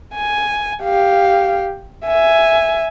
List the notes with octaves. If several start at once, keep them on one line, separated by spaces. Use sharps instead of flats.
G#5
G4 F5
E5 G#5